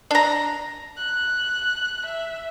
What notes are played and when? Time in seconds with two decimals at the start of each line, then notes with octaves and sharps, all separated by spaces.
0.11 D4 A#5
0.97 F#6
2.06 E5